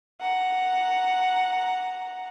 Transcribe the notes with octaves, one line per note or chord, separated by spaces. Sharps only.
F#5 A#5